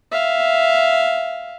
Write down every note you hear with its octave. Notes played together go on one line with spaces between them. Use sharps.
E5 F5